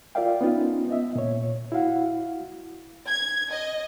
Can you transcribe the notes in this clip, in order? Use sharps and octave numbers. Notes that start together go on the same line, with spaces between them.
F4 A#4 D5 E5 F5 G5
B3 C#4 D#4 F4
B3 D#5 E5
A#2 C#5
E4 F#4 F5 F#5
G#6
D#5